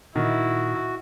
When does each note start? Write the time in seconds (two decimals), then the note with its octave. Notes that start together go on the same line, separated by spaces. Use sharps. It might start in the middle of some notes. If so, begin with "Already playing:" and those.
0.16 A#2 D#3 E4 F#4